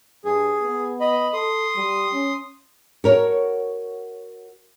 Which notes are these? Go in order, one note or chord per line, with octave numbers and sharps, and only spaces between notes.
G2 G#4
B3
D#5 B5
A4 C6 D#6
G3
C#4
F#4 A#4 C#5